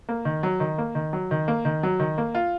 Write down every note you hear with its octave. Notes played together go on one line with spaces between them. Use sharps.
A#3
D#3
F#3
D#3
A#3
D#3
F#3
D#3
A#3
D#3
F#3
D#3
A#3
F4